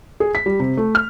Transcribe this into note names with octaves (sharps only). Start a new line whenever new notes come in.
G#4
B6
G3
C3
A3
F6